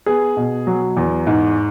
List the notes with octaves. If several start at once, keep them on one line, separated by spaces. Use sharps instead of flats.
B3 G#4
B2
F#3
E2
G#2